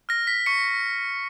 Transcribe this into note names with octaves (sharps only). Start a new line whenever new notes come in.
F6 A#6
B6
C#6 C#7